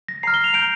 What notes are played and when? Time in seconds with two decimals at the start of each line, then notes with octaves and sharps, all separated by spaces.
0.08 A#6
0.23 A#5 F6 C7
0.34 G7
0.44 F7
0.54 A#5 G6 D7